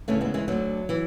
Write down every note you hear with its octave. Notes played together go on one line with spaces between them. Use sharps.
D2 C#3 E3 A3 C#4
G#3 B3
E3 G#3
D2 D3 F#3
E3